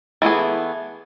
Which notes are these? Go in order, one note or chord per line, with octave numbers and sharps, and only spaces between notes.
E3 A3 B3 G#4